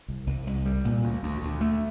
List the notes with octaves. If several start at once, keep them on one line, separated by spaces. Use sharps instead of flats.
C2
C2
C2
G3
A#2
D2
D2
D2
A3